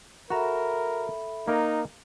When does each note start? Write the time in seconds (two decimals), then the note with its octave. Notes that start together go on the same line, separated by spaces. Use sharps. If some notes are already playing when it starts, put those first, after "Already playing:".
0.30 F#4 A4 A#4 E5 A#5 B5
1.48 A#3 D#4 A#4